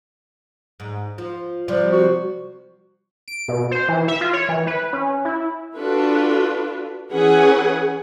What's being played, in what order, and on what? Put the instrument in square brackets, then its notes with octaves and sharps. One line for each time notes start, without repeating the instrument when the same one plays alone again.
[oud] G#2
F3
[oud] C3 F3 G3 [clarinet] D5
[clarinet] F#4
[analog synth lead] D7
B2
C5
E3
E5
F4
C#5
E3
B4
C#4
E4
[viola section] D4 F4 F#4 A4 B4
E3 C#4 G#4 B4 F#5 G#5